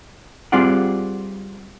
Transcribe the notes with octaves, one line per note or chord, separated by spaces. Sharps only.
G3 C4 F4 G#4 D5 F#5